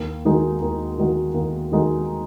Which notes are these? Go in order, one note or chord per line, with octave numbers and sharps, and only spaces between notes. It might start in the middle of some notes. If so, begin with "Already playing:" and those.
Already playing: D#2
D#3 G#3 D#4 F#4
D#2
D#3 G#3 D#4 F#4
D#2
D#3 G#3 D#4 F#4